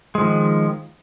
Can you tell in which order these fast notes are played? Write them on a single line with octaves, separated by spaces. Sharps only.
G#3 F3 D#3